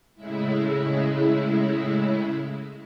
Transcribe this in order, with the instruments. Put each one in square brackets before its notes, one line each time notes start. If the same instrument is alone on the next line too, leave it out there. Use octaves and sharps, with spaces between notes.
[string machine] A2 C#3 G#3 E4